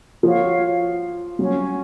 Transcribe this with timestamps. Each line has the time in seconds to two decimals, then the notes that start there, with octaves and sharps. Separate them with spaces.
0.23 F3 F#4 C#5 F5
1.39 F#3 C#4 F#4 C#5 G#5